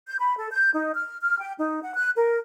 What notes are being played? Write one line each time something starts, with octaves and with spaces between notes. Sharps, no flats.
G6
B5
A4
G6
D#4
F6
F6
G5
D#4
F#5
F#6
A#4